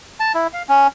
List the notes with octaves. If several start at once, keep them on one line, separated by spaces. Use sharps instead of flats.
A5
E4
F5
C#4